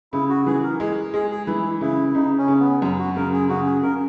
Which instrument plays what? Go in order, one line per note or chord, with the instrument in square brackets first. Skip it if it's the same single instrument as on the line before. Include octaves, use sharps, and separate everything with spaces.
[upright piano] C#3 [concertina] E4
[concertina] F#4
[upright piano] E3 [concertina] G#4
[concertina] A#4
[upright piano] G#3 [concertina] G#4
[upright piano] G#3 [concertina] G#4
[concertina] G#4
[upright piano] E3 [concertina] E4
[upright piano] C#3 [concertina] E4
[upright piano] C#3 [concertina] D#4
[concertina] C#4
[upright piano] C#3
[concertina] B3
[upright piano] F#2
[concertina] F#4
[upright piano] C#3 [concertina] A#4
[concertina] G#4
[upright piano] C#3 [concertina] F#4
[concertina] G#4
[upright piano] C#3 [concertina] A#4